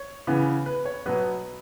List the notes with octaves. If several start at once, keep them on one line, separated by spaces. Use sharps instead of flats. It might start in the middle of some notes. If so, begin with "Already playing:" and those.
Already playing: C#5
C#3 E3 B3
B4
C#5
B2 F#3 B3 B4